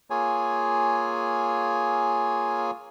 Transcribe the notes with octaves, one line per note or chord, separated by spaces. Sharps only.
A#3 F4 G#4 C#5 G#5